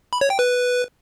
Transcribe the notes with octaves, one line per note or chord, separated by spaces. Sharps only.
B5
C#5
G5
B4